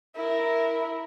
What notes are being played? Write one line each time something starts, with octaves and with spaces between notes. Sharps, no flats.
E4 A#4